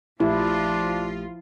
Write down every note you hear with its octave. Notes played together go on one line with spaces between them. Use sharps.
A#1 F3 A3 D4 E4 F4 G4